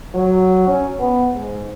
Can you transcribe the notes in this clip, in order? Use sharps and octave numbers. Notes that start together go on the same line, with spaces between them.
F#3
C#4
B3
G#2